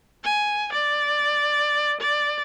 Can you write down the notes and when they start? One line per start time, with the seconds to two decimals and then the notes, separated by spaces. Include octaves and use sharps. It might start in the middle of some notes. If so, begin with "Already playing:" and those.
0.24 G#5
0.73 D5
2.01 D5